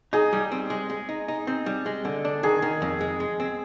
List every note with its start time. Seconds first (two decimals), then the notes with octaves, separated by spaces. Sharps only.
0.13 D#4 G#4
0.33 G3
0.52 C4
0.70 G#3
0.90 G#3
1.09 D#4
1.28 D#4
1.47 C4
1.66 G3
1.86 G#3
2.05 D3
2.25 D4
2.43 D#3 G#4
2.62 D#3
2.82 F2
3.01 G#3
3.20 G#3
3.40 C4